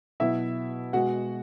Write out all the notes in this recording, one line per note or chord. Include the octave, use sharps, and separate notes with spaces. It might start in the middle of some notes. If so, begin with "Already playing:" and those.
B2 F#3 E4 E5
B2 G#3 F#4 F#5